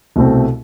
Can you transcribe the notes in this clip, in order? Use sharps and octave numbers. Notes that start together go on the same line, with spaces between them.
C2 B2 A3 C4